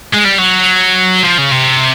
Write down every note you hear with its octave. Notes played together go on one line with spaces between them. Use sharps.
G#3
G3
F#3
F3
C#3
C3